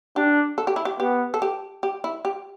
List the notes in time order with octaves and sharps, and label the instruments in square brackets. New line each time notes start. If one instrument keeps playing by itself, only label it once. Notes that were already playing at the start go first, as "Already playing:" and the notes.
[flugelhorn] D4 [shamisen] G4
[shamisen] A4
G4
E4
G4
[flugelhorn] B3 [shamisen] G4
[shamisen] A4
G4
G4
E4
G4